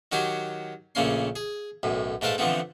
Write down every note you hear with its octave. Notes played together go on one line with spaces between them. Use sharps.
D#3 F#3 F#4 G4 G#5
A#1 C#3 A3 A#3 C#4 C6
G#4
B1 F#2 A2
G#2 A3 A#4 B4 F5 A5
D3 E3 F3 A3 B3 C4